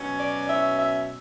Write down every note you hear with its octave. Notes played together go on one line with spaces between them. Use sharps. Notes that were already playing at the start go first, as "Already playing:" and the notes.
Already playing: B2 F#3 C#4
D5
E5
E5